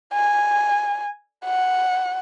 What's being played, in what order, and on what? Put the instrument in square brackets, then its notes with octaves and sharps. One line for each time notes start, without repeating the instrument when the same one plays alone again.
[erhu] G#5
F#5